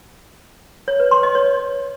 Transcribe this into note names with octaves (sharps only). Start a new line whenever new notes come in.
C#5
B4
C6
D#5
C#5